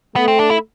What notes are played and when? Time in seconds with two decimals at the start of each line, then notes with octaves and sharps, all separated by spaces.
0.16 A3 B3
0.28 C4
0.39 D4
0.50 E4